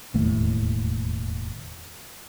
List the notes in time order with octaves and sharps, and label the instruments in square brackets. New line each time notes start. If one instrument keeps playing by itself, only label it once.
[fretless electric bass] E1 D#2 A2 A3